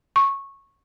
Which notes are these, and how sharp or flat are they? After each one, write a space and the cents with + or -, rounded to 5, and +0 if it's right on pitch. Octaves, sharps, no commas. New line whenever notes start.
C#6 -15